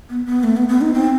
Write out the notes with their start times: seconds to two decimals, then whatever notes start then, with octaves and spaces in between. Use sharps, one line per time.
0.10 B3
0.26 B3
0.44 A3
0.57 B3
0.69 B3
0.81 D#4
0.94 C4